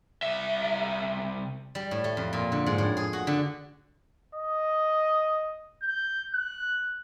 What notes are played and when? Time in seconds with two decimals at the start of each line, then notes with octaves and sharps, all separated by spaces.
0.23 C2 E5
1.75 G3
1.91 A2
2.04 A3
2.17 F2
2.33 A#2
2.52 D3
2.66 G#2
2.78 A2
2.97 G#4
3.13 F#4
3.27 D3
4.35 D#5
5.82 G6
6.34 F#6